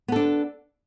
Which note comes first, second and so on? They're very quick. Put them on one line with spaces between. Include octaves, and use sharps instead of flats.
B3 A4 D4